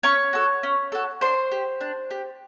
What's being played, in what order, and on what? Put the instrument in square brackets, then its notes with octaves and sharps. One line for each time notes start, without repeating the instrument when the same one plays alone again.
[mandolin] C#4 C#5 C#6
F#4 A4
C#4
F#4 A4
D4 C5 C6
G4
D4
G4